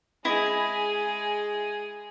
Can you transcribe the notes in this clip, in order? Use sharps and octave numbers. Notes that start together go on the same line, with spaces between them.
G#3 E4 G#4 D#5